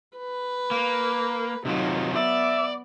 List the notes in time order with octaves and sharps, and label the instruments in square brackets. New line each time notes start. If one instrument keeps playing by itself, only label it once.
[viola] B4
[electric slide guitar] A#3
[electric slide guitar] C3 D#3 F4 [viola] F#3 D#4
[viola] B3 [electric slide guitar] D5 [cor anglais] E5